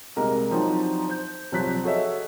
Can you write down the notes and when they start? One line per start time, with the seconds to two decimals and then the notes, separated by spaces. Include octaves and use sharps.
0.16 C2 G#3 A#3 A#4 D#5 A#5
0.51 F3 F#3 C4 D4 D#4 F#4
1.08 C5 G6
1.52 C2 F3 F#3 F#6 B6
1.84 F#4 G#4 A4 C#5 D#5 E5